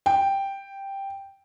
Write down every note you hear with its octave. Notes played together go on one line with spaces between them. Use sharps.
G5